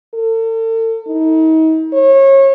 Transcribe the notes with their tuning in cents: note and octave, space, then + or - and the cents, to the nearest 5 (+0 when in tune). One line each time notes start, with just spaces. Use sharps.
A4 +40
D#4 +40
C#5 -30